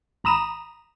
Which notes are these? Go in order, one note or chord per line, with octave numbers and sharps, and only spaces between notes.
G#1 A#5 B5 D#6 E7